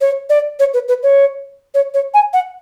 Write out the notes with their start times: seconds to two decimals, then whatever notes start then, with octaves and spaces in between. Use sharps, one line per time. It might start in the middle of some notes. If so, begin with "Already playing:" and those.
0.01 C#5
0.29 D5
0.59 C#5
0.74 B4
0.88 B4
1.03 C#5
1.74 C#5
1.94 C#5
2.14 G#5
2.33 F#5